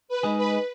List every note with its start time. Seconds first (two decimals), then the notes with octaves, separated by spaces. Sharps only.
0.09 B4
0.23 G#3 D#4 G#4
0.37 B4